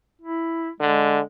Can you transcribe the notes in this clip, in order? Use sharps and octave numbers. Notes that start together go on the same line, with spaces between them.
E4
D3 G#3